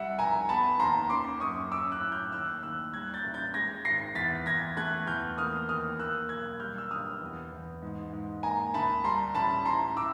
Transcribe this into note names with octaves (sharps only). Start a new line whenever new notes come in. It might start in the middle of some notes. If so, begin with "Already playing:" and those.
Already playing: C2 G3 E5 F#5
F1 G#5 A#5
B3 A5 B5
D#2 A#5 C6
C#4 C6 D6
F#2 C#6 D#6
C#4 D6 E6
E6 F#6
A2
F6 G6
D#2 E6 F#6
D#2 E6 F#6
G3 F#6 G#6
G6 A6
A1
G6 A6
G#3 G#6 A#6
G#1 A#6 C7
E2 A6 B6
E2 G#6 A#6
A3 F#6 G#6
E2 F6 G6
A#3 D#6 F6
D#2 D#6 F6
A#3 E6 F#6
B1 F#6 G#6
G3 F6 G6
E6
G1 D#6 F6
E2
E2
G#2
G#2
A#3 G#5 A#5
D2 A5 B5
G3 A#5 C6
A1 A5 B5
A2 A#5 C6
A2 D6 E6